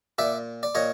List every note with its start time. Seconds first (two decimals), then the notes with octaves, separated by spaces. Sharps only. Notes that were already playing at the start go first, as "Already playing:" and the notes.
0.18 A#2 D5 E5
0.63 D5
0.75 A#2 C#5 D#5